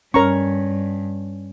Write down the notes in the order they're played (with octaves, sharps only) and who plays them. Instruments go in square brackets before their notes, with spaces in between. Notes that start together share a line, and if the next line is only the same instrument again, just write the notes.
[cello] G2 [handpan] C#4 C#5 [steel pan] A#4 A#5 C#6